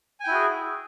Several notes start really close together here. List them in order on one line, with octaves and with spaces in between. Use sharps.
G#5 G5 E4 F#4 G#4